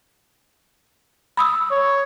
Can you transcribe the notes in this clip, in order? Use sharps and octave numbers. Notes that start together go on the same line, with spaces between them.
B5 D#6 E6
C#5